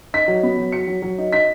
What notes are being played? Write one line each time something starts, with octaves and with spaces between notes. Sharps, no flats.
D#4 B6
F#3
B3
F#3
F#3 C#7
F#3
F#3
D#4
D#4 B6